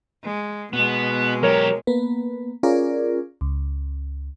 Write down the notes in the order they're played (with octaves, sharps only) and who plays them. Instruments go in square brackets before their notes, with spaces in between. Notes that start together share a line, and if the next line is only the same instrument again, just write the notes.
[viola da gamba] G#3
[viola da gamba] B2 G#3 [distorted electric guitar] B3
[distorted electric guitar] F#3 G4 [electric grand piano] A#4 C#5
[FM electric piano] A#3 B3 B4
C#4 F4 G#4 A#4 D5
C#2